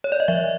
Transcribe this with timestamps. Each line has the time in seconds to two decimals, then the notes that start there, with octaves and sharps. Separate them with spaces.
0.04 C#5
0.12 D5
0.20 D#5
0.28 F3 E5